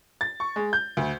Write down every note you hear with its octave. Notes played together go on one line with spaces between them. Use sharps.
A6
C#6
G#3
G6
D2